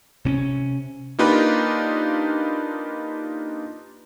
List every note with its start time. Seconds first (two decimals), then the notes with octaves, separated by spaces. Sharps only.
0.25 C3 C4 C#4
1.19 A#3 D4 D#4 F4 G4 B4